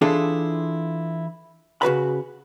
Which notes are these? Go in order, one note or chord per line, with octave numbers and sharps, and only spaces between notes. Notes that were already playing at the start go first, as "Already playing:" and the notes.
E3 D4 E4 F4 G#4 A4
C#3 F#4 B4 B5